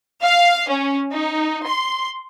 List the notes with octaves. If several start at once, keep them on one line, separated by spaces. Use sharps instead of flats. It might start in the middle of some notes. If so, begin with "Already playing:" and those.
F5
C#4
D#4
C6